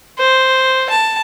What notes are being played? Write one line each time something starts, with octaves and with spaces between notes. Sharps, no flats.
C5
A5